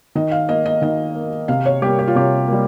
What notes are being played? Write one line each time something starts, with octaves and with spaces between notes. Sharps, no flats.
D#3 D#5
F5
A#3 D#5
D#5
D#3 D#5
A#3
C3 F5
C#5
G3 A#3 G4
G4
F4
C3 G4
G3 A#3